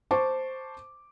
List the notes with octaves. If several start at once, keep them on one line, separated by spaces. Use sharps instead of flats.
C5 A5 C#6 D6